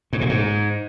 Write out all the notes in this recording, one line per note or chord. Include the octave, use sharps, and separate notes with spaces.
G#2
A#2
G#2